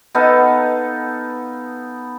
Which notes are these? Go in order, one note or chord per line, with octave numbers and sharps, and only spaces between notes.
B3 D#4 A4 F5